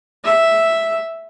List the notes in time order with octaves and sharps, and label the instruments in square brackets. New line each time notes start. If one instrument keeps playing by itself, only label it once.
[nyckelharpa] E5